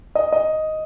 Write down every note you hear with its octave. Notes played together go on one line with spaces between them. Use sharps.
D#5
D#5